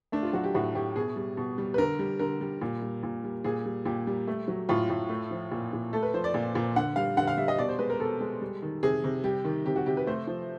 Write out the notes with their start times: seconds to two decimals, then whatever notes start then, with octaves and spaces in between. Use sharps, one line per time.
0.12 A3 D4
0.23 F4
0.33 F#3 F#4
0.44 G4
0.54 A2 F#4
0.75 A2 G4
0.96 B2 G#4
1.16 G3
1.37 B2
1.58 G3
1.74 B4
1.78 D3 A#4
1.99 G3
2.19 D3 A#4
2.41 G3
2.61 A#2
2.82 G3
3.03 A#2
3.24 G3
3.44 A#2 G#4
3.65 G3
3.85 A#2 G4
4.07 G3
4.28 A3
4.48 F#3
4.69 A2 F4
4.90 A2
5.09 A3
5.31 F3
5.51 A#2
5.73 A#2
5.93 A3 A4
6.03 B4
6.14 F3 C5
6.24 D5
6.34 A#2
6.55 A#2
6.76 D3 F#5
6.96 G3 F5
7.17 D3 F#5
7.27 F5
7.38 G3 E5
7.48 D#5
7.58 B2 D5
7.69 C5
7.79 G#3 B4
7.90 A#4
8.00 B2 A4
8.20 G#3
8.42 G3
8.62 D#3
8.83 C3 G#4
9.04 C3
9.24 G3 G4
9.44 D#3
9.66 C3 G4
9.76 F#4
9.86 C3 G4
9.97 B4
10.07 A3 C5
10.27 F3